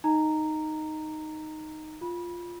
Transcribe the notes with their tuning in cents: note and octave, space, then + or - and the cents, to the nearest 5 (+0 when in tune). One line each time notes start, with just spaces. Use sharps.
D#4 -5 D#5 +0 A#5 -10
F4 +0 B5 -25